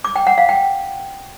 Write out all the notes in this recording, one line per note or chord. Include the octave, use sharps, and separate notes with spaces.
D6
G5
F#5
F5
G5